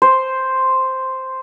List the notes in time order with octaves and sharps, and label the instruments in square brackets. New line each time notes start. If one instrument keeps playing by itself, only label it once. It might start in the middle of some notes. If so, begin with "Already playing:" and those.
[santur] C5